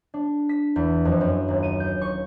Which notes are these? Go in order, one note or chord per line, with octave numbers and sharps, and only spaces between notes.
D4
B6
E2
F2
F#2
D#1
D#7
G6
C#6